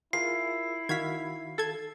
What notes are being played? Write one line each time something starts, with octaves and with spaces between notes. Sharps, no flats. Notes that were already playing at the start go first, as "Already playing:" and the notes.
E4 F4 G#4 A#4 C7
D#3 F#4 F5 G#6 B6
A4 G#6